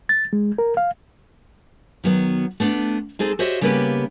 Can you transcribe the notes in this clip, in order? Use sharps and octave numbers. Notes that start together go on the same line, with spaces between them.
A6
G#3
A#4
F5
D#3 F#3 B3
A3 B3 D4
G#3 C4 D#4 G#4 A4
F#4 G4 C5 C#5 D#5 E5
C#3 G3 A#3 B3 G4 B4